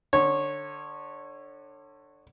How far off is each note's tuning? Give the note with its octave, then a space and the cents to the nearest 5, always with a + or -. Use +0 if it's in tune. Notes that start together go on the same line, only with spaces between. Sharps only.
D3 +20 C#5 -15